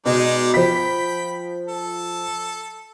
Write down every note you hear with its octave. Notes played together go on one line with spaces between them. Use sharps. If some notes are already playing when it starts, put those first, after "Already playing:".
B2 G#3 D#4 D5
F3 G5 B5 B6
A4